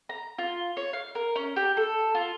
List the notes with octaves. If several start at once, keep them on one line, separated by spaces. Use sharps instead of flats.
A#5
F4
C#5
F5
A#4
C#4
G4
A4
F4